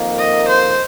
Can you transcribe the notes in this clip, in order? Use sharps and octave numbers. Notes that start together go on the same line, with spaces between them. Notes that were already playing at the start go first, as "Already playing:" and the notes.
Already playing: F2 D#3 A#3
D#5
C5